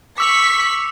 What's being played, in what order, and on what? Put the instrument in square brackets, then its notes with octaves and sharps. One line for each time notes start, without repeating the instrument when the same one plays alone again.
[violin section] C#6 B6 [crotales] D6 E6 F7